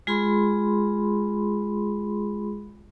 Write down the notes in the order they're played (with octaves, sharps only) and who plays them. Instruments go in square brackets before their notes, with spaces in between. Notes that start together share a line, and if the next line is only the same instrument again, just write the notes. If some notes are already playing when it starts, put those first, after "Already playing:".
[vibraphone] G#3 F4 G#4 B5 C6